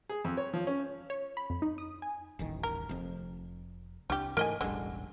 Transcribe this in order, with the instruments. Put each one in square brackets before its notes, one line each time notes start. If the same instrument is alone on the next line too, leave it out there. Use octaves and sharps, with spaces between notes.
[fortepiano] G#4
F2
C#5
F3
C#4
[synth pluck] C#5
B5
F2
D#4
D#6
G#5
[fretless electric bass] D#1 A1 D#3
[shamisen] A#4
[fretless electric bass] F1 F2
[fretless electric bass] C2 D4 [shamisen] G3 G4
[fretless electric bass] G#2 E3 A3 [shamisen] A#4 D#5 G#5
[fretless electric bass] E1 A1 G3 [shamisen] D3 G#3